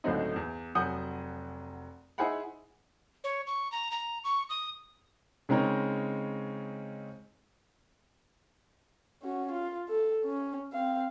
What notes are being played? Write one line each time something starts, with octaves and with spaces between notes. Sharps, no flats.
C#2 A2 D3 F#3 C4 D#4
E2
F1 F#3 F#5 G#5 D#6 G6
D#4 E4 G#4 C5 F#5 B5
C#5
C#6
A#5
A#5
C#6
D#6
C#3 G#3 C4 D#4 A#4 C#5
C#4 F#4
F4
A4
C#4
C4 F5